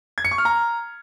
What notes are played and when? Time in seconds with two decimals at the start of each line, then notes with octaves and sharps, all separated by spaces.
0.18 G#6
0.25 C#7
0.31 C#6
0.38 F6
0.45 A#5